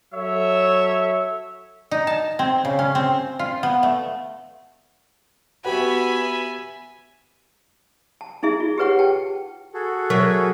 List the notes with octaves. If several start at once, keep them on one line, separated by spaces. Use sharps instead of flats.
F#3 A4 C#5 E5
D#4
A5
C4
C#3
C#4
C4
F4
B3
A3
B3 F#4 G4 B4 E5 F#5 G#5 B5
A5
D#4 E4 G#4 E5
F4
G4 G#4 B4 C#5 F#5
G5 A5
F#4 G#4 A4
F#3 A#4 E5